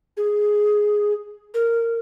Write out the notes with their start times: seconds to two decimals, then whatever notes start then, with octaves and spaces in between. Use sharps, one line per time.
0.17 G#4
1.54 A#4